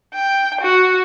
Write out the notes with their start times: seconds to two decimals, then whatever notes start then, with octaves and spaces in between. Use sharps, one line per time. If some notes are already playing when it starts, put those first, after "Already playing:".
0.14 G5
0.61 F#4